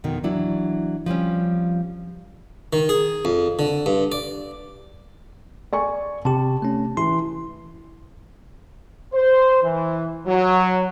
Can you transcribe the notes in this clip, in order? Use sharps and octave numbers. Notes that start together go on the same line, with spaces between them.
F2 B2 D#3
E3 F#3 D4 E4
F3 G3 C4 C#4
D#3
G#4
F2
D3
G2
D5
D5 G#5 C#6
C3 G4 A5
A3 C#4
E3 C6
C5
E3
F#3